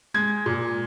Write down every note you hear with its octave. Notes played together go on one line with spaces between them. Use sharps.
G#3 G#6
A#2